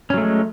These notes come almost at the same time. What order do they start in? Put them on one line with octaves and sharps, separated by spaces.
C#4 F#3 A3 G#3